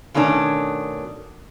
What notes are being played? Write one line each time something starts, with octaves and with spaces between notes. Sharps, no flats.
B2 D#3 A3 C#4 D4